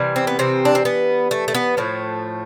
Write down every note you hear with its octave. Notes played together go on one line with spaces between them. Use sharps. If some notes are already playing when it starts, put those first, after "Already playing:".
Already playing: C3 E3 G3
C4
B3
C3 C4
D4
C4
B3
A3
A3
B3
A2 F3 A3